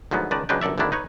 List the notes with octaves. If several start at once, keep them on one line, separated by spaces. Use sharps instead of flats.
D2 G#2 F3 F#3 B3
C#2 D#3 B4 D5 A5
C#2 F#3 G#3 D4 B4 G5
G1 F#2 A4 D5 E5
G#1 D2 D3 D#3 D4 E4
D#4 B4 C#5